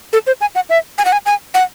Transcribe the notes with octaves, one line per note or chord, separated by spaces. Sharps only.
A4
C5
G#5
F#5
E5
G#5
F#5
G#5
G#5
F#5